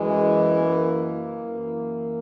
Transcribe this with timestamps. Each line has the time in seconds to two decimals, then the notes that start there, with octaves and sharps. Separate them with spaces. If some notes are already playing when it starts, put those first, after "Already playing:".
Already playing: F#2 E3 G#3
0.59 A#3
1.41 F#2 E3